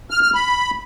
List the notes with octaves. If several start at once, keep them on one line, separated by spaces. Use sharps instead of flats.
F6
F6
B5